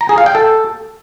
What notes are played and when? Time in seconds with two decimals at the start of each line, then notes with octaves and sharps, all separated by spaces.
0.01 A#5
0.09 G#4
0.18 F5
0.26 G5
0.35 A4